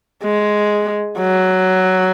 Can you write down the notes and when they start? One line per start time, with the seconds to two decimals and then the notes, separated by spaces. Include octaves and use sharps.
0.24 G#3
1.19 F#3